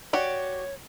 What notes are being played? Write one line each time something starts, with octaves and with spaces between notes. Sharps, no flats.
F#4 G4 C#5 D5